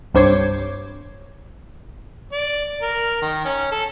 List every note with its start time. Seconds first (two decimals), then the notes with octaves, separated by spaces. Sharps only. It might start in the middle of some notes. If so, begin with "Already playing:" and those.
0.14 C2 G2 C5 C#5 D6 G#6
2.32 D5
2.82 A#4
3.22 D#3
3.45 C#4
3.72 A4